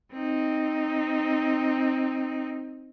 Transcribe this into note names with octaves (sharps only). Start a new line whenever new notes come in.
C4 D#4